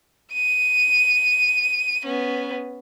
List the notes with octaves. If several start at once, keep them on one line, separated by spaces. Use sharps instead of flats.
D#7
B3 C#4